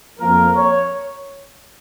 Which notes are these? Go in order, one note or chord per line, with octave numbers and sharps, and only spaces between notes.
F2 F3 A#3 A#4
C#5